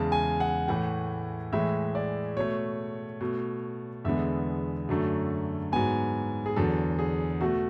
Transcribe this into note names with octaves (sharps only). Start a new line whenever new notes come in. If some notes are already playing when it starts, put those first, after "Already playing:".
Already playing: E2 C#3 G#3 A5
G#5
F#5
A2 E3 A3 F#5
A2 E3 G#3 E5
D5
B2 A3 C#5
B2 A3
E2 D3 G#3 B3 E5
F#2 D3 F#3 A3
G#2 F#3 B3 G#5
G#4
E2 D3 F#3 A4
G#4
B2 A3 F#4